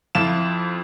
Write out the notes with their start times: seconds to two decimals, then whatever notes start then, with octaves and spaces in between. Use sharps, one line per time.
0.15 F2 E4 F4 A5 E7